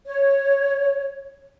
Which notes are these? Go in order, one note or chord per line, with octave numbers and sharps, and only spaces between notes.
C#5